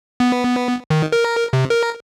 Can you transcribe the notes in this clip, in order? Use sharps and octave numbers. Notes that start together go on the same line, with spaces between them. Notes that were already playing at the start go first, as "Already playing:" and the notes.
B3
D#3
A#4
C3
A#4